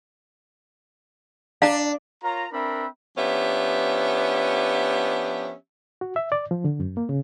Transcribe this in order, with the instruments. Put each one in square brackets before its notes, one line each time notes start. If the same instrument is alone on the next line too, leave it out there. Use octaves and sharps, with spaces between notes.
[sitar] D4 [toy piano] F5 A#5
[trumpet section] F4 A#4 C#5 A#5
C4 D4 A#4 B4 E5 B5
[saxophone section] F3 B3 C#4 D4 G4 E5
[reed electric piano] F#4
E5
D5
F3
D3
F#2
A#3
C#3